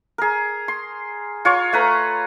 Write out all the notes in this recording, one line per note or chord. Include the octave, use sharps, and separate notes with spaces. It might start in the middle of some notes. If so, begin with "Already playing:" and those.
G#4 A#4
C6
F4 C#5
A3 B4 A#5